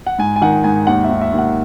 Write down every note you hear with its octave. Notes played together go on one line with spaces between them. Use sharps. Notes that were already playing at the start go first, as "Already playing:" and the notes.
F#5
G#2 G#5
G#5
D#3 F#5
G#2 G#5
D#2 F#5
D#2 E5
E5
D#2
F#5